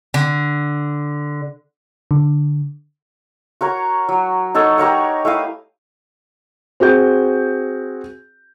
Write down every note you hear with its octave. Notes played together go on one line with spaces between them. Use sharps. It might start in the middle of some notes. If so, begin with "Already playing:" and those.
D3
D3
F#4 A#4 C#5 A#5
F#3
D#4 F#4 A4 C#5
G4 A#4 C#5 F#5
A3 E4 F5 D#6
C4 F#4 G#4 G6